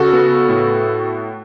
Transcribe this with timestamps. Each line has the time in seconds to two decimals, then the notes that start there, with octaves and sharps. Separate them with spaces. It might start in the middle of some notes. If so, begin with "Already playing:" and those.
Already playing: C#3 F#4 A4
0.13 B3
0.49 A2